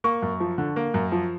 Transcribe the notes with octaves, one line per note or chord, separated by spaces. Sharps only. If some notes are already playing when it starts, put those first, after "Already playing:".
A#3 C#6
F#2
F3
D3
A#3
F#2
F3